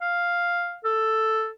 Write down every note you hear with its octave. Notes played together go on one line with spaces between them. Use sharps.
F5
A4